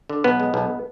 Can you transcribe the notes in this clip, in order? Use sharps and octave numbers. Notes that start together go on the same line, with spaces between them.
D3
B1 B3
G#3
B1